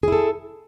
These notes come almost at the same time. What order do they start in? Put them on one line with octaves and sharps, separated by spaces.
G#4 E4 A4